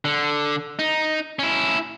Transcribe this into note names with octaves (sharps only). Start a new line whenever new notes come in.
D3
D#4
C#4 E4